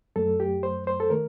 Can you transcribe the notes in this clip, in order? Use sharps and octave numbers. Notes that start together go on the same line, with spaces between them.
F#2 F#3 A3 A4
G4
C5
C5
A4
D#3 A3 A#4